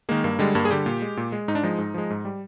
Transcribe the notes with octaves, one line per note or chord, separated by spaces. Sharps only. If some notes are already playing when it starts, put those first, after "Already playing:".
D#3 G#3 A#3
G2 A#3
D3 G3 G#3
G2 A#3
G#4
D3 G3 G4
A#2
G#3
A#2
G#3
G#2 D#4
D4
F3 G#3 D#4
G#2
F3 G#3
G#2
G3